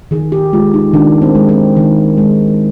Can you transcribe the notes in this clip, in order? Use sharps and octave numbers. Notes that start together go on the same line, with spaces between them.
D#3 G#4
G4
G#3 F4
D#4
D#3 D4
C4
G#3
C4
D#3
G#3